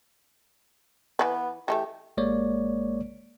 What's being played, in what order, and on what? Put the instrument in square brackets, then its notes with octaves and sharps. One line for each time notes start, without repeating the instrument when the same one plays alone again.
[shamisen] E3 B4 [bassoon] B3
[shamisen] E3 G#3 A3 [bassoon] G4
[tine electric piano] A1 G#3 A#3 C#5 D5